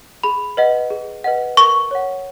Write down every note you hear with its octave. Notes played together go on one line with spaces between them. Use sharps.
G#4 B5
B4 D#5 F#5
G#4
B4 D#5 F#5
A#4 C#6
C#5 F#5